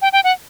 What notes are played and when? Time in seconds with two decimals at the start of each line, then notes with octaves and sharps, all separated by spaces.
0.02 G5
0.13 G5
0.24 F#5